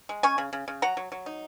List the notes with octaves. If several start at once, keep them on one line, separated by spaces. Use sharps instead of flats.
G#3
C#4 G#5 C#6
C#3
C#3
C#3
F#3 F#5 A#5
F#3
F#3
D#4